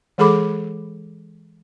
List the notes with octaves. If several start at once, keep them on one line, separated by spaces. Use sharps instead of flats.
E3 G#3 G#4 A4 B5 D6